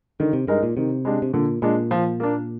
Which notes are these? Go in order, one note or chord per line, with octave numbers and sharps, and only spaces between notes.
D3 D#3
C3
G2 G#3 D#4 A#4
A#2
C3 D#3
G#3 D4 G4
C3
A#2 D3
A#2 G#3 D4
F3
A#3 D4